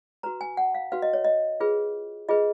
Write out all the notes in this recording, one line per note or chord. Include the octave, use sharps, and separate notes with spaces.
F#4 B4 A#5
G#5
F#5
F5
F#4 B4 F5
D#5
C#5
D#5
F4 G#4 B4
F4 G#4 B4 D#5